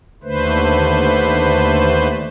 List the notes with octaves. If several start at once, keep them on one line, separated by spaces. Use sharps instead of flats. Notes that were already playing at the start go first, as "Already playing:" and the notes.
D#2 D3 A3 B4 C5